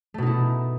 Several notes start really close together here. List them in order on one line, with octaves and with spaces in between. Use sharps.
A3 B2 D#4 E4